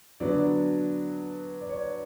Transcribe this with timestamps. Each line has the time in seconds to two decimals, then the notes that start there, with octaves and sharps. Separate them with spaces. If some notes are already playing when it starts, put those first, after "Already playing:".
0.20 D3 F#3 B3 D4 D5
1.61 D5
1.69 C#5